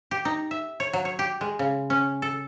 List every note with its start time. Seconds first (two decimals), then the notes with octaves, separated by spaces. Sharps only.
0.11 G4
0.25 D#4
0.51 E5
0.80 C#5
0.93 F#3
1.05 C#5
1.19 G4
1.41 G#3
1.59 C#3
1.90 C#4
2.22 A4